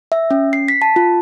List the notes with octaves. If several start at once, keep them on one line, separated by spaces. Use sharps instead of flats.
E5
C#4
C7
B6
A5
F4